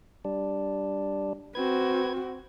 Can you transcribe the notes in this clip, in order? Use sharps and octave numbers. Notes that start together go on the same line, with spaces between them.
G3 D4
C4 F#4 B4 G#6